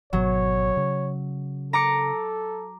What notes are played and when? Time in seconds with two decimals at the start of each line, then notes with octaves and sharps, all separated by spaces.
0.13 G#1 B2 F#3 C#5
0.77 C#3
1.73 A4 A#5 D6 C#7